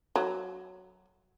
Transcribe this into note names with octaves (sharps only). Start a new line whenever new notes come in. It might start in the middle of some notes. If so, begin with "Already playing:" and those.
F#3